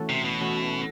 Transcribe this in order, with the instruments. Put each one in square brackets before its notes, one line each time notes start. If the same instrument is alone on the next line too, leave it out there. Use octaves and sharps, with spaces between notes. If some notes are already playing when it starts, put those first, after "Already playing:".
Already playing: [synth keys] E3 A3 C#4 F#4 A4
[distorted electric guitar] C3
B2
[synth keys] E3 A3 C#4 F#4 A4